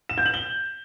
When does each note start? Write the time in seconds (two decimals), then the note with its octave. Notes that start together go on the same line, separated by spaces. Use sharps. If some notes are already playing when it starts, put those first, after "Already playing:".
0.09 E7
0.18 G6
0.26 F#7
0.34 G7